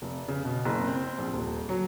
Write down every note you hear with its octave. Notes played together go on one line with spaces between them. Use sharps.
F1
C#3
B2
F#1
C4
A#1
D#1
F#3